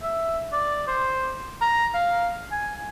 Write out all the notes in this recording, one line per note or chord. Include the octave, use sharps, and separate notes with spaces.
E5
D5
C5
A#5
F5
G#5